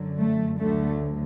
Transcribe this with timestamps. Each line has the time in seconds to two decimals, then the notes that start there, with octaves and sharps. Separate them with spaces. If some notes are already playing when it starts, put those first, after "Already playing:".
Already playing: F#2 D3 F#3
0.21 A3
0.60 D2 D3 F#3 A3